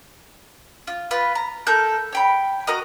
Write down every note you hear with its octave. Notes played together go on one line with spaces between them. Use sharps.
F4
F4 B4
A#5
A4 A#4 G6
C#5 G5 B5
F#4 A#4 D#5